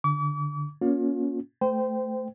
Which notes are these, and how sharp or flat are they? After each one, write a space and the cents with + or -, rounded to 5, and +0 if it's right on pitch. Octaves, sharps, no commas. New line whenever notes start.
D3 +0 D6 -45
A#3 +30 C#4 +20 F4 +40
A3 +0 C5 -25 G5 -5